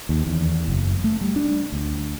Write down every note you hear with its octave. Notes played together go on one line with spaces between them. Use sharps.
D#2
E2
F#1
A3
G3
D4
D2